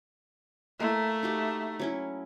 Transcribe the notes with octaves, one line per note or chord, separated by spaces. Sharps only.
A3 A#3 E4
D#4 F#4 G4
F#3 C#4 E4